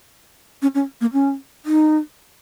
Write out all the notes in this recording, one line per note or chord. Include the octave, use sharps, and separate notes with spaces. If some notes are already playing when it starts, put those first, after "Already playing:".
C#4
C#4
A#3
C#4
D#4